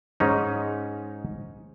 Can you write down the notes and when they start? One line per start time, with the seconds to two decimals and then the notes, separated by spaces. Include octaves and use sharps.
0.20 G#2 C#4 D#4